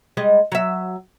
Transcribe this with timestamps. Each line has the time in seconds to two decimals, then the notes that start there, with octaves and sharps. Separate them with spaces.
0.17 G3 G#3 D#5
0.52 F#3 E5